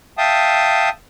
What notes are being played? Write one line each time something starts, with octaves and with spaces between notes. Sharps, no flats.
E5 F5 G5 A5 D#6